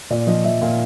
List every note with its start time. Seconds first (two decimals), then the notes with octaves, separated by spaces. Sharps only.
0.10 A#2 D5
0.27 F3 D#5
0.44 F3 E5
0.62 A#2 F5